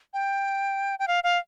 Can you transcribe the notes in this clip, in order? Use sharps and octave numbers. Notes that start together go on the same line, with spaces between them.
G5
G5
F5
F5